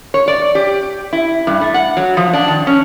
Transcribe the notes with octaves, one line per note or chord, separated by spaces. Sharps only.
C#5
D5
G4
E4
G2
A3
F#5
F#3
F3
D4
D#3
C#4